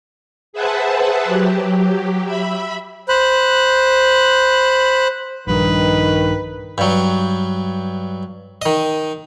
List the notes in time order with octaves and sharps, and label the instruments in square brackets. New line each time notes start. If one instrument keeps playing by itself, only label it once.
[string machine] G#4 B4 C5 E5 F#5 A5
F#3 G4
E5 B5
[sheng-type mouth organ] C5 B5 F#6
[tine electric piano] A#1 G2 [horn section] D#3 [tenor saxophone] B4
[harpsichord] G2 F#3
D#3 D#5